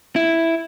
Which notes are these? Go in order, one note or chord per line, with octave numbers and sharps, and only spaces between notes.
E4